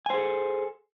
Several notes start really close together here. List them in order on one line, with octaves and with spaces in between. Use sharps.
G#5 C5 G#4 A4